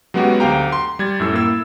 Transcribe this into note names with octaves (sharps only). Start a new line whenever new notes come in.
F#3 G#3 B3 C#4 F#4 G4
D2 G4 F5 G5 A#5
C6
G3 G#6 A6
F#2 A2 E6
A#3 E4 E6